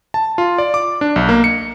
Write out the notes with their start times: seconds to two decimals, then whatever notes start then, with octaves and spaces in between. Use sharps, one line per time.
0.14 A5
0.38 F4
0.58 D5
0.74 D6
1.01 D4
1.16 B1
1.29 A#3
1.44 C#7